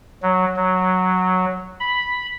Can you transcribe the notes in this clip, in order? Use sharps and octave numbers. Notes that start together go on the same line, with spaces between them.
F#3
F#3
B5